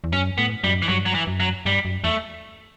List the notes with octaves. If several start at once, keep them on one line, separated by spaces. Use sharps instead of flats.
E2
F#2 C#4
A2 B3
F#2 G3
E3
G2 F#3
F#3
E3
F#2
F#3
G2 G3
F#2
E2 A3